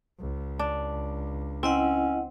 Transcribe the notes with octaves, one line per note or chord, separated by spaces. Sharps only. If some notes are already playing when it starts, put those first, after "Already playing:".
C#2
D4
C4 C#4 E4 D#5 F#5